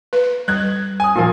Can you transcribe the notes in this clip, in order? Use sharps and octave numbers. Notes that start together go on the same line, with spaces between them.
B4
G3 F#6 G#6
G#5 D#6
A#2 F3 A#3